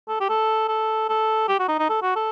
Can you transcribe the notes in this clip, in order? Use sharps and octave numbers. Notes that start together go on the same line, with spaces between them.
A4
G4
A4
A4
A4
G4
F#4
D#4
D#4
A4
F#4
A4